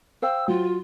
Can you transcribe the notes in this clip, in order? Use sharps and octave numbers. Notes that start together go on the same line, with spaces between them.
C5 F5 G5 E6
F#3 F4